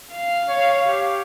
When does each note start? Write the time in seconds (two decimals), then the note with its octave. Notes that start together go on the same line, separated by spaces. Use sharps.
0.14 F5
0.49 C#5
0.86 G4